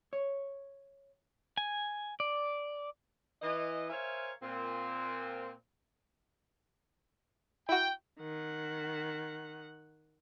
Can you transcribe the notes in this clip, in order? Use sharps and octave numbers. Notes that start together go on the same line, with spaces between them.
C#5
G#5
D5
E3 D#5
A#4 C5 C#5 E5 F5 G#5
A#2 C4
E4 F#4 G5
D#3 F#5